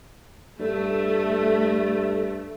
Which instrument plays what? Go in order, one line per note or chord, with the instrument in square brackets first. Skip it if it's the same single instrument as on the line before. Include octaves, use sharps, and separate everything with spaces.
[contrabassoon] G2 [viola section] A3